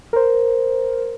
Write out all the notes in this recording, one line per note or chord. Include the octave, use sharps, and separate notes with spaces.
A#4 C5